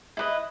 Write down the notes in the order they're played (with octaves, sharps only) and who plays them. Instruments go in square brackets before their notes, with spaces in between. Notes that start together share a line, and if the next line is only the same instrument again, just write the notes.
[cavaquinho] E4 B4 D#5